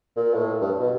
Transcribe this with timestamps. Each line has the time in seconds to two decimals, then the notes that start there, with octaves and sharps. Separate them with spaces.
0.16 A#2
0.34 A2
0.61 G2
0.80 B2